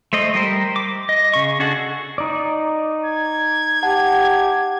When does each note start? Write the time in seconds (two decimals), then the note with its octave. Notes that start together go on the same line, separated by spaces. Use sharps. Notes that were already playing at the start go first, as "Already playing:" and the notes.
0.13 A3 C5 D#5
0.35 G3 G4 A#4 C5
0.76 D6
1.09 D#5
1.34 C#3 C#6
1.60 D4 F#4 G#4 A4 F#5
2.18 D#4 D5
3.06 G#6
3.83 G4 F#5 A5